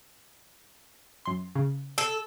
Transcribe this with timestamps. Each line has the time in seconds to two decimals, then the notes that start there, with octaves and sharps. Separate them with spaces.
1.25 F#2 C6
1.55 C#3
1.98 A4